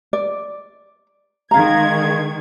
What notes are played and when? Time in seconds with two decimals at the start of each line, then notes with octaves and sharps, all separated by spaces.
0.13 D5
1.51 D#3 G#3 F5 A#5 G#6